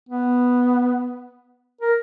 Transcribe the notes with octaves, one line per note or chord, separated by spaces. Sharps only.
B3
A#4